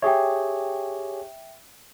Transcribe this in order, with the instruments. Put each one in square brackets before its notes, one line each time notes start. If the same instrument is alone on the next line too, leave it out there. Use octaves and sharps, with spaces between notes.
[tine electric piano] G4 G#4 C#5 [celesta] E5 G5